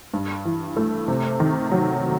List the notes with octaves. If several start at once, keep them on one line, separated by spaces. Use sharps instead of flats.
G2
E3
A3
C3
D#3
F#3